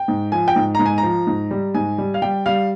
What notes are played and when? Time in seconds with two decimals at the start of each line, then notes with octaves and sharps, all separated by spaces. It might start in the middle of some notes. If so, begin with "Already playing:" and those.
Already playing: G5
0.08 G#2
0.32 F3 G#5
0.48 G5
0.56 G#2
0.75 G#2 A#5
0.86 G#5
0.98 A#5
1.03 F3
1.27 G#2
1.51 G3
1.75 G#2 G#5
1.98 G3
2.14 F5
2.22 G3 G5
2.46 G3 F5